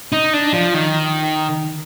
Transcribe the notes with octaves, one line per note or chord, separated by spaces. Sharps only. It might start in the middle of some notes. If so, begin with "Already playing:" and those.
D#4
D4
F3
D#3